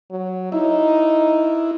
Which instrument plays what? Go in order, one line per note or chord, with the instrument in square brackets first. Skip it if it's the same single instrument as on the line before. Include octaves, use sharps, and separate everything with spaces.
[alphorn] F#3
[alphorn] D#4 [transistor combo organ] E4